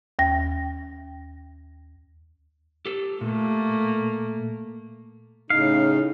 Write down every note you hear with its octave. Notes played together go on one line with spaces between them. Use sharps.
D#2 G5 A#6
G4 A4
A#2 A3 A#3
A2 C#3 D#4 F5